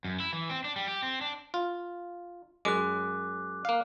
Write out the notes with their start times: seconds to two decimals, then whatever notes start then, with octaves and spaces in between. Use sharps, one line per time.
0.05 F#2
0.20 E4
0.33 E3
0.50 C4
0.64 D4
0.76 G3
0.88 G4
1.03 C4
1.21 D4
1.54 F4
2.65 F#2 G#3 D6 F#6
3.65 A#3 F5